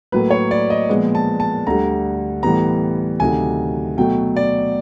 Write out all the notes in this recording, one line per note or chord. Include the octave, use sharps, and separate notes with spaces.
A2 F#3 A#3 B4
C#5
D5
D#5
A#2 F3 G#3 B3
A5
A5
D2 D3 G3 A#5
A2 E3 G3 B3 A#5
D2 C3 D#3 F#3 G#5
B2 F#3 A3 G5
D5